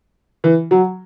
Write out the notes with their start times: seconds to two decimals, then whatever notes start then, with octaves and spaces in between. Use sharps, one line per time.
0.44 E3
0.71 F#3